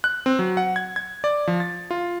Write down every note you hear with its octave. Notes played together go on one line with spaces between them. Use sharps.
F#6
C4
F#3
F#5
G#6
G#6
D5
F3
A6
F4